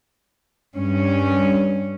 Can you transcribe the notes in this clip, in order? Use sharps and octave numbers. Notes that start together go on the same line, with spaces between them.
G2 C#4